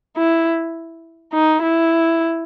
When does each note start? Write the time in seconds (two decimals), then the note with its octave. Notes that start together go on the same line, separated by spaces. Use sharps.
0.17 E4
1.33 D#4
1.63 E4